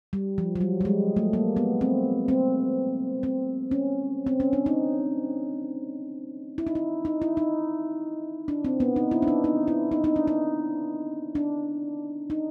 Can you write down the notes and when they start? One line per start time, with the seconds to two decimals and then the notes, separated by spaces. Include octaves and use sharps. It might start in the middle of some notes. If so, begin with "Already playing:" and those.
0.13 G3
0.38 F3
0.55 F#3
0.61 G3
0.81 G3
0.85 G#3
1.16 A3
1.33 A#3
1.57 B3
1.81 C4
2.28 C4
3.23 C4
3.71 C#4
4.27 C4
4.40 C#4
4.53 D4
4.66 D#4
6.58 E4
6.67 D#4
6.75 E4
7.05 D#4
7.22 E4
7.37 D#4
8.48 D4
8.65 C4
8.80 B3
8.96 D#4
9.11 E4
9.22 D4
9.28 D#4
9.44 D#4
9.68 E4
9.92 D#4
10.04 D#4
10.16 D4
10.27 D#4
11.35 D4
12.30 D#4